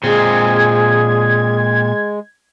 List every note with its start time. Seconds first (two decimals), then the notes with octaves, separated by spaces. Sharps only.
0.04 A#2 G#3 C4 G#4 G#6